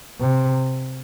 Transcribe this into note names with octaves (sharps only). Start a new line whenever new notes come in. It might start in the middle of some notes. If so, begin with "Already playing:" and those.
C3